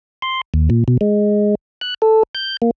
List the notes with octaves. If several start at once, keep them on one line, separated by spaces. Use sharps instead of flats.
C6
D#2
A#2
B2
G#3
F#6
A4
G6
A#3